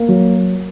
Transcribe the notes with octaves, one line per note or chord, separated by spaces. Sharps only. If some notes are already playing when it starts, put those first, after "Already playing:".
Already playing: A#3
F#3